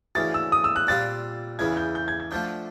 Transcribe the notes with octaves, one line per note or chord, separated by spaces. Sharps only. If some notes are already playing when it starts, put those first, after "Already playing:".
D2 C#3 E3 A6
E6
D#6
E6
F#6
A#2 G3 C4 F4 A6
E2 C#3 E3 G#6
G6
G6
G#6
G#6
D3 F3 A3 G6